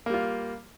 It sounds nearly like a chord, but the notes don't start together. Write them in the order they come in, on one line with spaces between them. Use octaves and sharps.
A#3 G3 F4